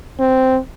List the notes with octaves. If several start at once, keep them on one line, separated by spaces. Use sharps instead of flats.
C4